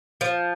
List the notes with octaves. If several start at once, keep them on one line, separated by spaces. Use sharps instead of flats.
F3